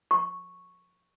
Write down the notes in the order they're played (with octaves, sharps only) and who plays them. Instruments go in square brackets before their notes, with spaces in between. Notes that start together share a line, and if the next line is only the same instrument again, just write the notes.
[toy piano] C#6